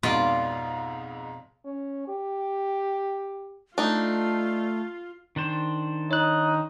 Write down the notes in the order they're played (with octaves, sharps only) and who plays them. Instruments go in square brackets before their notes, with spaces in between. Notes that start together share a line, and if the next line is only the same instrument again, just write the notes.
[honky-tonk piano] F2 G#2 D#4 [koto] B2 [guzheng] F4 D5
[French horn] C#4
G4
[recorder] A3 [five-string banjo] D4 D#4 [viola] F4
[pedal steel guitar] D#3 D4 C5
[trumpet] D#4 [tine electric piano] C#5 F#6